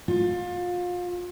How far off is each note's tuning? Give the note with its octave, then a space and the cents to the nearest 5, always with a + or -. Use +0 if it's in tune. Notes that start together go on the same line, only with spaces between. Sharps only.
F4 +30